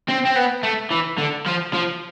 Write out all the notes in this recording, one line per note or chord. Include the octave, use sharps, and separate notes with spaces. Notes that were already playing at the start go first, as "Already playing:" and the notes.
C4
C4
B3
A3
E3
D3
F3
F3